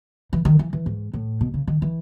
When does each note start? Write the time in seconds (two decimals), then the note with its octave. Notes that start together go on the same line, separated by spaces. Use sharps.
0.33 E3
0.45 D#3
0.59 E3
0.73 E3
0.86 G#2
1.13 A2
1.41 B2
1.54 C#3
1.67 D#3
1.82 E3